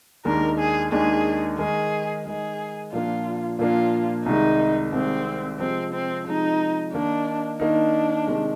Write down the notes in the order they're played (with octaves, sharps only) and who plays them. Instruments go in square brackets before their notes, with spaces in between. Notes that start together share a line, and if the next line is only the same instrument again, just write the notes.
[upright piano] D#2 D#3 G#3 D4 [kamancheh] A#4
[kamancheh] G#4
[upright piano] D#2 D#3 G#3 D4 [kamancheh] G#4
[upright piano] D#3 G#3 D#4 A#4 D#5 [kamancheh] G#4
[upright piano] D#3 G#3 D#4 A#4 D#5 [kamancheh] G#4
[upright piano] A#2 F3 A#3 D4 [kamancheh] F4
[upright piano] A#2 F3 A#3 D4 [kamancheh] F4
[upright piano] C2 C3 D#3 G#3 [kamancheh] D#4
[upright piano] C2 C3 D#3 G#3 [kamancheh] C4
[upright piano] C3 F3 G#3 [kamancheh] C4
[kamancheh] C4
[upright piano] C3 F3 G#3 [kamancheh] D#4
[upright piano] D#3 A#3 D#4 [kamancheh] D4
[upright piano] D#3 A#3 D#4 [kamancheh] D4
[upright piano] C3 D#3 G#3